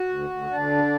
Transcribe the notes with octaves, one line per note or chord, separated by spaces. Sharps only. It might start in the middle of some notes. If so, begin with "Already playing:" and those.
Already playing: F#4
D2
D2
D2 D4
D3